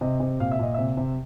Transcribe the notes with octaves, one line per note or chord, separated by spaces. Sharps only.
C3 D#5
C3
A#2 F5
E5
A#2 D#5
C3 E5
C3